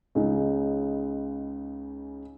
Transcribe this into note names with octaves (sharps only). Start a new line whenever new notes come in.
C#2 C#3 D#4